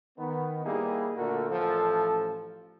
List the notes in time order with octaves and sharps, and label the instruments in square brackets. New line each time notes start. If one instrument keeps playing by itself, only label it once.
[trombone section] D#3 B3
G3 A#3 D#4 E4 G4 G#4
A#2 D3 A3 F#4 A#4
A1 F3 A4